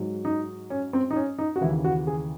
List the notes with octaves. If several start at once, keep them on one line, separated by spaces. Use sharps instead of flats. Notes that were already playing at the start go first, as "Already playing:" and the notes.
Already playing: G#2 F#3
D#4
C#4
C4
D#4
C#4
D#4
F#4
D#2 C#3 E3 E4
F#4
G#4